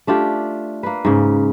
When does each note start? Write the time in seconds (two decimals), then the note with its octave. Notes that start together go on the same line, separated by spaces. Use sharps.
0.07 A3 D4 F4 G4
0.83 A#3 B4
1.05 G#2 C#3